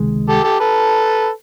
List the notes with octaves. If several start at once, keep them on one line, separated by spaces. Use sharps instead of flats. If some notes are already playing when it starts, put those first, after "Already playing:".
Already playing: C#2 C3 D#3 G#3
G4 A4
G4 A4
A4 B4